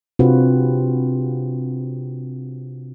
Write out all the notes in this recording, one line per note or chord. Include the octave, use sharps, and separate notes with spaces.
C3 C4 D4 F4 F#4 B4